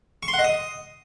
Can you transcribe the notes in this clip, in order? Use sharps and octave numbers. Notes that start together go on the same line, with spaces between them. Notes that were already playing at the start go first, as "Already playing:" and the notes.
C#6
C6
F#5
D#5
D#6